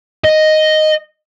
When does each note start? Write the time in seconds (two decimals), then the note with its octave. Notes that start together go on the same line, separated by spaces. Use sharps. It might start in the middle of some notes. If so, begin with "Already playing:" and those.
0.25 D#5